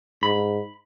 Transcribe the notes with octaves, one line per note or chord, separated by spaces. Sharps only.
G#2 B5